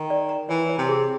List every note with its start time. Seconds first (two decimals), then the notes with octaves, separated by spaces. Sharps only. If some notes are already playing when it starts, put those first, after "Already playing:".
Already playing: D#3
0.10 D5
0.29 A#5
0.49 E3 C#5
0.69 C#5
0.78 C3
0.89 G#4